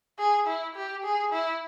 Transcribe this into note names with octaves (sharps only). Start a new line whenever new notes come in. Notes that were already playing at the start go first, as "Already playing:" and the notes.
G#4
E4
G4
G#4
E4